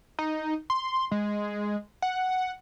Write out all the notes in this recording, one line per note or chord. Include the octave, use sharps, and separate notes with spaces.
D#4
C6
G#3
F#5